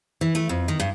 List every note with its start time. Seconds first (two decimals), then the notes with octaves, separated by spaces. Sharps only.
0.21 E3
0.35 A3
0.49 F2
0.68 D#3
0.80 G2